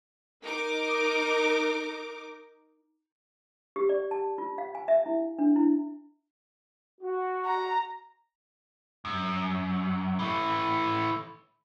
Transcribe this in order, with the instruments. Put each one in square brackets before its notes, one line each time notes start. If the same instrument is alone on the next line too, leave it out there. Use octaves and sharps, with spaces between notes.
[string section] D#4 A#4 D6
[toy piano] G4
D5
A5
F4
F5
G#5
E5
E4
D4
E4
[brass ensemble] F#4
[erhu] A#5
[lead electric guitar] F#2
E3 A3